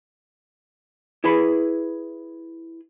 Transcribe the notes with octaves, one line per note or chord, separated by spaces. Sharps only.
E4 G#4 B4 B5